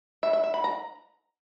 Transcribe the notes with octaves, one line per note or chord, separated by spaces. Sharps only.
E5
E5
E5
B5
A#5